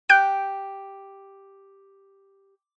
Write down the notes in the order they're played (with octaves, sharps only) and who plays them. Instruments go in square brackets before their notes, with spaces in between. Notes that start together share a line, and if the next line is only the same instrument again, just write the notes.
[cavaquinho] G4 [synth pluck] F#6 G6 D7